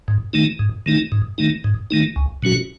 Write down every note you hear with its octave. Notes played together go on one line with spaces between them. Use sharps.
G#2
D#3 A3 D#4
G#2
D#3 A3 D#4
G#2
D#3 A3 D#4
G#2
D#3 A3 D#4
C#2
B2 F#3 C#4 F#4